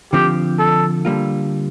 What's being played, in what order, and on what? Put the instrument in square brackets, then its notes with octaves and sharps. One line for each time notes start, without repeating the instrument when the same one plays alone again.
[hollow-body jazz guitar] D3 F3 C4 [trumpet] G4
[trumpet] A4
[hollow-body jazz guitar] D3 G3 A#3 F4